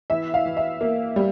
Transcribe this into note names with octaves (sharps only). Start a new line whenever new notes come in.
E3 E5
F5
E3
E5
A#3
G3